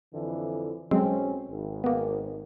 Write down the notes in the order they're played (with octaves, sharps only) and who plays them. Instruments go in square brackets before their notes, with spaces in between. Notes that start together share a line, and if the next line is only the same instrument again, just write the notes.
[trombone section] F2 D3 E3
[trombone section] B1 C#4 [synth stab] F#3 G#3 C4
[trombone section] G#1
[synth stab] A#3 B3